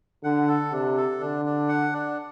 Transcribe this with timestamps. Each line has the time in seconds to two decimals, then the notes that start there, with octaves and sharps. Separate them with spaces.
0.24 D3 F#5
0.48 A4
0.72 C3 D4
0.97 A4
1.20 D3 D4
1.45 D4
1.69 F#5
1.93 D4